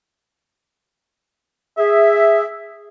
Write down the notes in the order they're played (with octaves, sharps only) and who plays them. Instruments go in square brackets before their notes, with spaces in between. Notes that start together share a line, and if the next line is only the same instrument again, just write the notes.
[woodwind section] G#4 E5